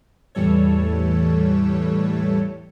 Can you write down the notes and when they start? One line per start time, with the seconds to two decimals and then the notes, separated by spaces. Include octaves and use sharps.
0.35 E2 A2 E3 G3 A4 C#5